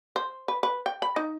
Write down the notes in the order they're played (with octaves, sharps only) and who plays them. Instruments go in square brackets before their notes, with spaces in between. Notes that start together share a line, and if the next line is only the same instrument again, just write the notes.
[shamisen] C5
B4
B4
G5
B5
D#4